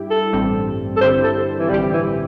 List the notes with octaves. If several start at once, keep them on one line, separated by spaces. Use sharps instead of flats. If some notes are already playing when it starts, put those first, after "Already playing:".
Already playing: G2 G3 E4 G4
A4
A1 G2 G3 C4
A4
G2 D3 C4 E4 G4 C5
A4
E3
A1 G2 D3 G3 C4 G4
E3